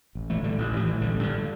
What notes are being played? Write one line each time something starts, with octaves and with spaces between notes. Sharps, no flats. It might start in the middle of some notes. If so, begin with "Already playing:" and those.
A1
E3 A3
A2
D3 G3
A1
E3
A2
E3
A1 D3 G3
G2 D3